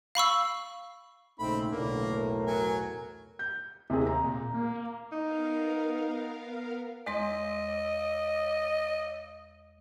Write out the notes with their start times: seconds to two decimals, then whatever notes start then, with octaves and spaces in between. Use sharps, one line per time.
0.15 F5 B5 C#6 E6
1.39 A#1 C#3 A3 C4 D#4 B5
1.72 B1 E2 A2 D3 A#3
2.13 A#4
2.47 F#3 G#5
3.39 G6
3.90 D#2 C3 G#4
4.07 A#5
4.23 A#2
4.54 A#3
5.12 B3 D#4 A#4 F5
7.06 E2 G#3 D#5 C6